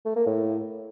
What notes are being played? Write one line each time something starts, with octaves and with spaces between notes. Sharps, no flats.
A3
A#3
A2